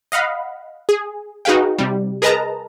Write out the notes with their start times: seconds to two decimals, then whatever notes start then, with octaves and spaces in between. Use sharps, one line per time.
0.12 D#5 F5 F#5 B5
0.89 G#4
1.45 D#4 F#4 G#4 B4 F5 G5
1.79 C3 G3
2.22 G#4 A#4 B4 D#5 A5 A#5